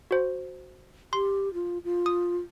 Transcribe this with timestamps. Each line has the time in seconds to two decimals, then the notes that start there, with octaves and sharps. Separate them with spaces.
0.11 F#4 C5
1.13 G4 C6
1.54 F4
1.84 F4
2.06 D#6